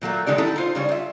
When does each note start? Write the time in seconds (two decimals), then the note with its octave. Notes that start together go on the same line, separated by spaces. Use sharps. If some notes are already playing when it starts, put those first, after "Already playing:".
0.02 A#2 F#3 A3 A#3
0.27 D3 D#3 G#3 D#4 G4 D5
0.38 D#4 E4 G4 A4
0.56 D#4 F4 C5
0.75 C#3 G3 C#5
0.89 F4 E5